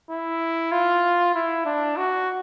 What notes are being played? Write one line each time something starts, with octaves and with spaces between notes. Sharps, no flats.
E4
F4
E4
D4
F#4